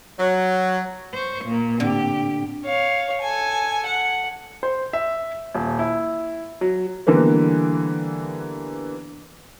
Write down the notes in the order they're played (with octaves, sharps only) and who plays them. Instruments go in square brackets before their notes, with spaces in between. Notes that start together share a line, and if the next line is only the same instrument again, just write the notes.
[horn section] F#3
[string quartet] C5 C#6
A#2 A#3
[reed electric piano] A2 C4 [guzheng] D3 [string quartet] G4
[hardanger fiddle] C#5 F5
A4 G#5
F#5
[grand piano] C5
E5
D#1
E4
F#3
D3 E3 G3 A#3 B3